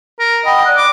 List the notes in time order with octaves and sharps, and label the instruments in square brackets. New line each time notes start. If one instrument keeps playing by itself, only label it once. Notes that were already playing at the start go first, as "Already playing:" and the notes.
[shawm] A#4
[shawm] D#5 [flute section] F#5 G5 B5
[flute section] D5 F#6
[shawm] D6